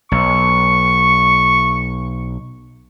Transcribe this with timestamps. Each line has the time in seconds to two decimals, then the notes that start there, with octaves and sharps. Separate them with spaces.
0.12 B1 C#6